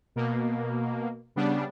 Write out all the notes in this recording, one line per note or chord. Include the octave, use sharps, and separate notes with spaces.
B2 A#3
C#3 G3 B3 D4